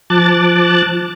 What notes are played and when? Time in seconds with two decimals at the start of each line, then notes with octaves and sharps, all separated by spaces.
0.10 F3 A5 D6 F#6 A6